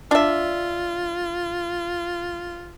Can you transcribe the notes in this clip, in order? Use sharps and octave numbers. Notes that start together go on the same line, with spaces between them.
D4 F4 E5